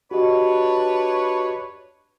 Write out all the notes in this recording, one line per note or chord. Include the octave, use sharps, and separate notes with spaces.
D4 F#4 G4 B4 C#5 D#5